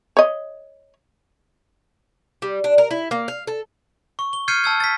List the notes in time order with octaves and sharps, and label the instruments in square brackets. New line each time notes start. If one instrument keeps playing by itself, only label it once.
[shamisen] C#5 D#5
[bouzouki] G3
D4
A#4
E4
A#3
F5
A4
[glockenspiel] C#6
G7
F6 G6 G#6 C7 C#7 D#7
A5 E6 G#6
A6 B6